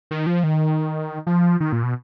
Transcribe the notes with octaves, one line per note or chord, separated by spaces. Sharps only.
D#3
F3
D#3
F3
D#3
A#2
B2